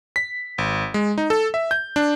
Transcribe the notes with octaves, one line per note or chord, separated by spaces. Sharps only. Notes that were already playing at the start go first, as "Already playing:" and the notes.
B6
G#1
G#3
D#4
A4
E5
G6
D4